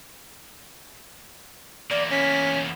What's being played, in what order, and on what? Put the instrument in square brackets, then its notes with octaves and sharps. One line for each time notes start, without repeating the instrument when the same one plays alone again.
[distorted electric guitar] E2 A#3 [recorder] D5
[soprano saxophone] C#4 [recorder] B6